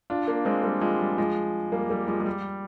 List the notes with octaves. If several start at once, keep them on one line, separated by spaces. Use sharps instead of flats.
D4 F4
A#3 D4
G#3 C4
G3 A#3
F3 G#3
G3
F3 G#3
G3 A#3
G3 A#3
F3 G#3
G#3
G3